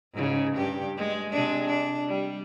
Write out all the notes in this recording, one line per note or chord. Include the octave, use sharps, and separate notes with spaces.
G#2 C#3
G2 G4
G#3
C3 G#3 D4
D4
G3